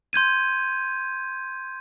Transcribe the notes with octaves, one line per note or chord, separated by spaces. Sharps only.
C6 G6 G#6 D#7